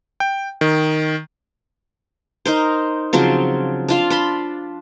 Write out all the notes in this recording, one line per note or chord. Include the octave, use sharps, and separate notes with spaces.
G5
D#3
D#4 A#4 C5
C#3 F3 F#3 C4
D4 F4 F5
D4 B5 C6